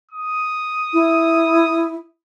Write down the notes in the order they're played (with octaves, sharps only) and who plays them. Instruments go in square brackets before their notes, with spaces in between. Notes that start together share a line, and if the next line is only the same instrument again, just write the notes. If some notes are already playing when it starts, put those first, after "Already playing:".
[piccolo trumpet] D#6
[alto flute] E4